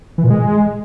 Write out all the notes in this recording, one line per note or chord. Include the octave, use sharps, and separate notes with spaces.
E3
A#2
G#3